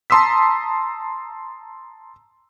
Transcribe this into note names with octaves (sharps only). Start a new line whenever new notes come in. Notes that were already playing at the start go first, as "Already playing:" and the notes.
A5 A#5 C6 D#6 E6 B6